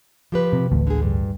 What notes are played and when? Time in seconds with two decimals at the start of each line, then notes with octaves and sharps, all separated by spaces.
0.32 F3 G4 B4
0.53 C3
0.72 A1 D2
0.87 D3 G#4
1.02 G2